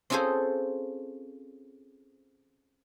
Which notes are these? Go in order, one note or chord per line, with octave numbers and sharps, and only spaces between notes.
C4 C#4 F4 G#4 A4 C5